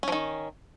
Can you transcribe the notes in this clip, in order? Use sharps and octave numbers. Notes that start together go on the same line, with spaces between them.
D#3 F3 C#4